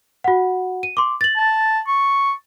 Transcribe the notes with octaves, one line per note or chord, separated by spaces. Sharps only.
F#4 F#5
D#7
C6 D6
A6 F#7
A5
C#6